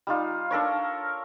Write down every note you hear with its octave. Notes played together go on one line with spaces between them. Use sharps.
G3 D#4 F4
D4 A4 A#4 C#5